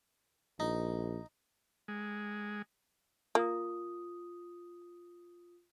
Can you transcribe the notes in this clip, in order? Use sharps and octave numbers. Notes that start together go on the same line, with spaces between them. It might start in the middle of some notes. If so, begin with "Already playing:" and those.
A#1 D#4
G#3
A#3 F4 D#6